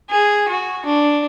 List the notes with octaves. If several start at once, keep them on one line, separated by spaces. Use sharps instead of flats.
G#4
F#4
D4